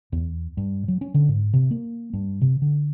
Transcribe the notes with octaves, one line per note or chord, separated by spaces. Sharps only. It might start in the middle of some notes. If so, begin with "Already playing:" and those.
E2
G2
F#3
C#4
D3
G#2
C3
A#3
G2
C3
D3